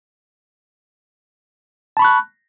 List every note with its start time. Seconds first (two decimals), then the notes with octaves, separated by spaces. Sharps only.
1.97 A5
1.99 B5
2.02 C#6
2.05 F#6